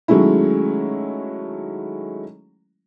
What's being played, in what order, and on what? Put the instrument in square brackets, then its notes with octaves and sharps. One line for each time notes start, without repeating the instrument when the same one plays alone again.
[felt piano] D#3 F#3 G#3 A3 C#4 E4